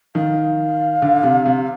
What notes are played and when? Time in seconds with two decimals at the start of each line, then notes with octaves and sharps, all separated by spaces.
0.15 D#3 F5
1.02 D3
1.23 C3
1.46 C3